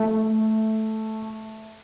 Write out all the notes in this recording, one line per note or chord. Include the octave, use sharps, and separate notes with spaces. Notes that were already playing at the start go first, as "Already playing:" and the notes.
Already playing: A3